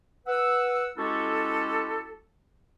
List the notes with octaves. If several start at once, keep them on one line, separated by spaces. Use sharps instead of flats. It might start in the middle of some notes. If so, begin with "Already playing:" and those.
B4 F#5 E6
G#3 C#4 E4 F#4 G4 A4